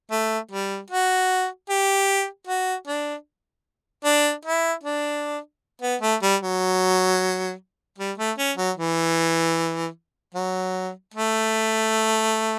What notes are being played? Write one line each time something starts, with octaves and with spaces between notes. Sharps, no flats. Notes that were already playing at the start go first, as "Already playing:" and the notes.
A3
G3
F#4
G4
F#4
D4
D4
E4
D4
B3
A3
G3
F#3
G3
A3
C#4
F#3
E3
F#3
A3